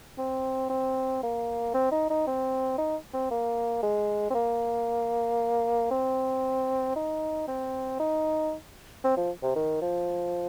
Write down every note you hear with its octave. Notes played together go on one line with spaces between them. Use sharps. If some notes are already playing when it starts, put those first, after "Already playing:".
C4
C4
A#3
C4
D#4
D#4
C4
D#4
C4
A#3
G#3
C4
A#3
C4
D#4
C4
D#4
C4
F3
C3
D#3
F3